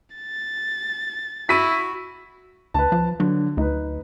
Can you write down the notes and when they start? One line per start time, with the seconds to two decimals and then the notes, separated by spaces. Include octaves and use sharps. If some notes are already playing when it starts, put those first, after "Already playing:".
0.15 A6
1.49 E4 F#4 B6 D#7
2.74 D2 B4 A5
2.92 F3
3.20 D3 F#3
3.57 D2 D#4 B4